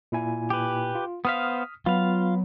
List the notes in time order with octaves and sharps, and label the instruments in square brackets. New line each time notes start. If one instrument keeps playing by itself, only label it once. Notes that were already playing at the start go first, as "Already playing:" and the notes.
[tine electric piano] A#2 E4 G#5
[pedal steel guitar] G4 B4
[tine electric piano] F4
[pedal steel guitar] B3 C5 F5 [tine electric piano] D#6 F6 B6
[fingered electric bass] F#3 [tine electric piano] B3 B5 [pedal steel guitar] F4 F5